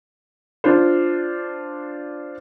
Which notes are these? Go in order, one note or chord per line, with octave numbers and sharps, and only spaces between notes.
D4 F4 C5